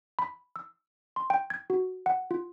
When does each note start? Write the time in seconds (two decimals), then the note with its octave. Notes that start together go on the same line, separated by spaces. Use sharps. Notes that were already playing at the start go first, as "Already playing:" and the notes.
0.19 B5
0.56 E6
1.16 C6
1.30 G5
1.50 G#6
1.70 F#4
2.06 F#5
2.31 F4